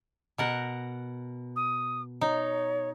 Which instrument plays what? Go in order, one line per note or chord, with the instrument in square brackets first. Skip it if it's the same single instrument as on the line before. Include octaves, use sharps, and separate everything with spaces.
[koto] B2 A#4 F#5
[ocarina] D#6
[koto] D#4 [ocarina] C#5